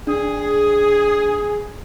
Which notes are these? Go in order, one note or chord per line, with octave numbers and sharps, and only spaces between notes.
D4 G#4